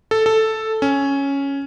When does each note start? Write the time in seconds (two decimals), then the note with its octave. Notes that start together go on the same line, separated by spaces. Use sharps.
0.11 A4
0.26 A4
0.82 C#4